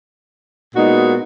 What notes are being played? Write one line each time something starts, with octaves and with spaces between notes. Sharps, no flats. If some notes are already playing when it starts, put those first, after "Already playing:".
A#2 G#3 B3 D#4 F#4